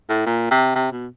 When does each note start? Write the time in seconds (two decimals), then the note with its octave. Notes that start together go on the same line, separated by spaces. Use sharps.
0.10 A2
0.27 A#2
0.51 C3
0.76 C3
0.92 B2